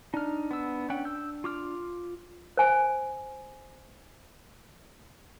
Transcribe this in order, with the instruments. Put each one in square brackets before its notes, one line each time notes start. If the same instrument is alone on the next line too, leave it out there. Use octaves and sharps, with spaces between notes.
[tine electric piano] D4 [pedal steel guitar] D#4 F6
[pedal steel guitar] B3 E6
C#4 F#5 G5
E6 G6
F4 D6 F6
[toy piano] C5 G#5